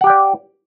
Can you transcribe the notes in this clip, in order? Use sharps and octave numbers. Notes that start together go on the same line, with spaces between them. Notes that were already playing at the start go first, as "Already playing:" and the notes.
G4 D5 F#5 G5